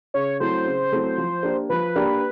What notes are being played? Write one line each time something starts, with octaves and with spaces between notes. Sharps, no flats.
C#3 C#5
F#3 A3 C4 E4 C5
C#3
F#3 A3 C4 E4
F3
A#3 D4 G4 A#4
F3 B4
A#3 D4 G4 A#4